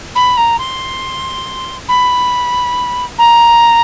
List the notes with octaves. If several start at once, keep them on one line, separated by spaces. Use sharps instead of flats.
B5
A#5
C6
B5
A#5